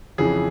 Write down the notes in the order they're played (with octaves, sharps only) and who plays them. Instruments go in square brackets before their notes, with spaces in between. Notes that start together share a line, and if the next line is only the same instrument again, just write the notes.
[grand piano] F2 C#3 E3 G#4